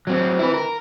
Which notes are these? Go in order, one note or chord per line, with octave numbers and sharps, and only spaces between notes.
F#3 C4
E4 B4
A#4